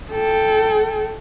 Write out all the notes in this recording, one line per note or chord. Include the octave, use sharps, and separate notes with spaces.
A4 G5